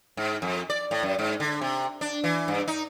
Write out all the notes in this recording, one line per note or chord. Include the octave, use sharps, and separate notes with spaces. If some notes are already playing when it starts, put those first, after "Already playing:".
G#2
F2
D5
A2
F#2
G#2
D3
C3
D4
E3
G2
D#4